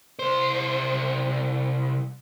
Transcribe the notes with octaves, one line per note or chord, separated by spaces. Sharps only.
C2 C5